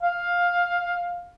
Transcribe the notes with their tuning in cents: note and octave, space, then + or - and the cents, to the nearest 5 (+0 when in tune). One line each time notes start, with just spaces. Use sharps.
F5 +10